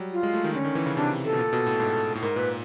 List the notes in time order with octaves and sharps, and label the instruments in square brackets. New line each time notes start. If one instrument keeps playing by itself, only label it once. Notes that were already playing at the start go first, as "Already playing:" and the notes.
Already playing: [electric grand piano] F#3 G3
[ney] F4
[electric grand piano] G#3
A3
D#3
[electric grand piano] D3 [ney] C#4
[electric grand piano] D#3
E3
C#3
[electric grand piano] C3 [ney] D4
[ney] A4
[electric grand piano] B2
A#2
B2
A2
G#2
A2
[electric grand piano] G#2 [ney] A#4
[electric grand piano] A#2 [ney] B4